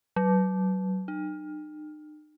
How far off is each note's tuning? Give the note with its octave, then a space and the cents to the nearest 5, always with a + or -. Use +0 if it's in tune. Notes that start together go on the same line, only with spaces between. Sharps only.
F#3 +25
D#4 -40